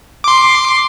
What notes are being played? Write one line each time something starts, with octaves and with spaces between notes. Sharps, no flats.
C6 D6